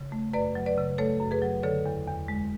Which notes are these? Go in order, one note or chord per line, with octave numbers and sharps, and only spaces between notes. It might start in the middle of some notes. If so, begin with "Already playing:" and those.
Already playing: C#3
A3
F#2 B4 D5
F#3
B4 D5
C#3
A3 A4 C#5
F#2
G#4 B4
F#3
D3 A4 C#5
E2
E2
G#3